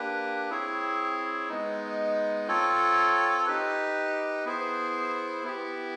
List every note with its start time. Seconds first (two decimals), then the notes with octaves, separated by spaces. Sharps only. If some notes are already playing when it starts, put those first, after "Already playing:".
Already playing: A#3 D4 G4 B4
0.50 C4 E4 G#4 C#5
1.49 G#3 B3 D#4
2.48 C4 F4 A4 C#5
3.46 D#4 G4 B4
4.45 B3 E4 G#4 C5
5.44 B3 E4 G4